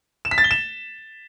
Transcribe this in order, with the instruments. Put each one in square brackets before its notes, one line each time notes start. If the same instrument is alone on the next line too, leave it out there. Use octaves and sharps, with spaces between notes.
[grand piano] E7
B6
A6
G7
E7